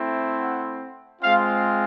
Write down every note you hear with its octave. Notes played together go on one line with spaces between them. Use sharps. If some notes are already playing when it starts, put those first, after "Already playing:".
Already playing: A3 C4 E4
F#5
G#3 C4 F4 F5